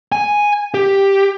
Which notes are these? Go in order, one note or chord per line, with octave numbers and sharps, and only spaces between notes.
G#5
G4